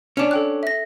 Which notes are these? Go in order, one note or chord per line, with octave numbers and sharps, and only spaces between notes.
C#4 D4
A4 G5 F#6
E5 A#6